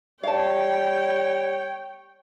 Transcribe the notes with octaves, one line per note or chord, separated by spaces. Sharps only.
G3 C#5 F5 G5 A5